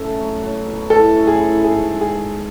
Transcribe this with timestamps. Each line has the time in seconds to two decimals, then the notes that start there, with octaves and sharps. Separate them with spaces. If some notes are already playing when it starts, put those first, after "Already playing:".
Already playing: C#3 A3 A4
0.18 F#3
0.42 F#3
0.66 B2
0.90 A2 A4
1.15 C#4
1.27 G#4
1.40 E4
1.64 G#2 G#4
1.88 G#3
2.01 G#4
2.13 G#3